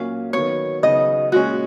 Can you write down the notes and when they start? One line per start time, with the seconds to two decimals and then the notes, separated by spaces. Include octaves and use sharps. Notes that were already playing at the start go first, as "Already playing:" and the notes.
Already playing: A#2 F#3 A#3 C#4 F5
0.33 D#3 F#3 B3 C#5
0.83 C#3 F#3 B3 D#4 D#5
1.32 A#2 G#3 C#4 F#4